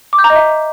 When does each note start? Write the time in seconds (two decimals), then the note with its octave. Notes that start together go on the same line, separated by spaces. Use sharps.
0.13 D6
0.18 G6
0.24 A#5
0.30 D#5
0.36 E5